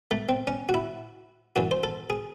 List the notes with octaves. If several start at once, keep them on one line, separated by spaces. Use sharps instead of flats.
A3
C4
C#4
F#4
E4
F#2 E3 F#4
C5
A4
G#4